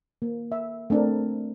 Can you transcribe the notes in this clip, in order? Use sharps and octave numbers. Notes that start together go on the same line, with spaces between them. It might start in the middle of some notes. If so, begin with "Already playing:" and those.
A#3
E5
A3 C4 D4 A4 A#4